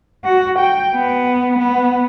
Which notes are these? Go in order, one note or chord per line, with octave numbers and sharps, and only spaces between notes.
F#4
G5
B3
B3